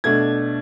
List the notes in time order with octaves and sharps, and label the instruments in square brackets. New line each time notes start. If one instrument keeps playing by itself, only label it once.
[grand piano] B2 A3 D4 G#6